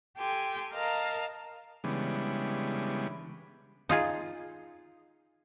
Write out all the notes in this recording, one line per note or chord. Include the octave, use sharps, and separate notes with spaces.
G4 A4 G5 G#5 C6
A#4 D#5 F5 A5 A#5
C#3 E3 G3 G#3 B3 D4
D#4 F4 G#4